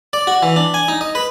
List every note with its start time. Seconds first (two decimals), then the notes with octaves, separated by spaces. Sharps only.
0.13 D5
0.27 F#4
0.43 E3
0.56 D4
0.74 G#5
0.88 D#4
1.01 D#5
1.15 B4